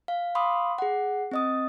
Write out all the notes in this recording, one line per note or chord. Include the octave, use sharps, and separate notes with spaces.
F5
F5 B5 C6 D6 D#6
G#4 F#5
C4 D#5 D#6